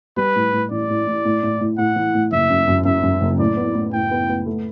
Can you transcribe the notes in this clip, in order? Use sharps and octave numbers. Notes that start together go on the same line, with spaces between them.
G3 B4
A2
A2
A1 D5
A2
A1
A2
A2
A2
A2 F#5
E3
A2
F#1 E5
F#2
F#2
F#2 E5
F#2
F#1
A2 D5
B3
A2
A2 G5
B3
B3
A3